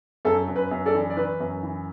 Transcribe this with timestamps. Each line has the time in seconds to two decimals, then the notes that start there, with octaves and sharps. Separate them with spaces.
0.25 F#2 A4
0.48 F#2
0.56 B4
0.71 F#2
0.86 A4 D5
0.94 E3
1.10 D5
1.17 E3 B4
1.40 F#2
1.63 E3